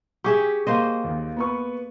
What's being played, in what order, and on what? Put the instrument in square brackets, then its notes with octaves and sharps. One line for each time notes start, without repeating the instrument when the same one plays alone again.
[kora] G4 G#4 E5 [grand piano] C#6
[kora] A#3 C5 D#5
[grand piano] D#2
B3 B4 C#6